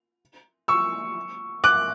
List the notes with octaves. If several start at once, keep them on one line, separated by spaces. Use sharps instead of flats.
C#6 E6
D6 F#6